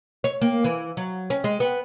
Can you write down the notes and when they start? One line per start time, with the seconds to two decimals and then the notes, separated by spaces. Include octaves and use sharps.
0.24 C#5
0.41 A#3
0.64 E3
0.97 F#3
1.30 C#4
1.44 G#3
1.60 B3